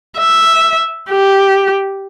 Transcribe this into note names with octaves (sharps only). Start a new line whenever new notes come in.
E5
G4